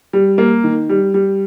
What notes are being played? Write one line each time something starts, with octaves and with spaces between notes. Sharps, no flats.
G3
A#3
D#3
G3
G3